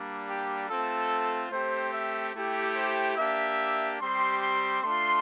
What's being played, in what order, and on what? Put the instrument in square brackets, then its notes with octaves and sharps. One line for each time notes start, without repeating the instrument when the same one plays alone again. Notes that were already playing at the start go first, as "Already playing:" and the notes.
Already playing: [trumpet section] G3 A#3 D4
G4
A3 C4 F4 A4
A3 C4 G4 C5
E5
A3 E4 G4
C5
A#3 D4 G4 E5
G3 C4 G4 C6
C6
A3 D4 F4 C6